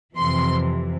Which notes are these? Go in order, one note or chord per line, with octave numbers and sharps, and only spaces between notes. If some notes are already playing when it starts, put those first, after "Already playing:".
F2 C3 E3 C6